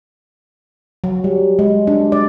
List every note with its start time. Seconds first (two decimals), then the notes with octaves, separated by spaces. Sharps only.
1.04 F#3
1.24 G3
1.59 G#3
1.87 D4
2.12 D5